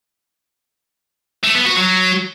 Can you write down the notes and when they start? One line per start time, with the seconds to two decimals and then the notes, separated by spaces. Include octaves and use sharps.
1.44 A3
1.55 B3
1.66 F#4
1.76 F#3